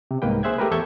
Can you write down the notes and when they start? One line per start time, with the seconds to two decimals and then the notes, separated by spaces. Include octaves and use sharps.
0.11 C3
0.22 C2 G#2 A#3 B4 G5
0.43 G#4 C5 E5 F#6 G#6
0.58 A3 G4 A#4 B4
0.71 E2 A4 E5 C#6 G6 G#6